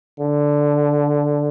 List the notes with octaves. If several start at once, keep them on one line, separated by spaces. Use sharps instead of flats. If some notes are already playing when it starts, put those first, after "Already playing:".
D3